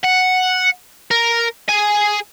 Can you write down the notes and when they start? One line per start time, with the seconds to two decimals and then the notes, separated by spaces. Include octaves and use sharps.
0.04 F#5
1.11 A#4
1.69 G#4 G#5